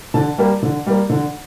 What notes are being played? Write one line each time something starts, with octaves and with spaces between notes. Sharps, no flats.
D3 A5
G3 A#3
D3
G3 A#3
D3